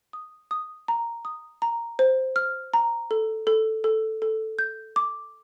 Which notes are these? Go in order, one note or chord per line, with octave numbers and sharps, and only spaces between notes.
D#6
D#6
A#5
D#6
A#5
C5
F6
A#5
A4
A4
A4
A4
G6
D6